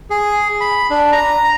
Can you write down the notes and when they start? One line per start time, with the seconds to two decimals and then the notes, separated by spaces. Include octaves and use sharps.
0.10 G#4
0.61 B5
0.90 D4
1.12 A#5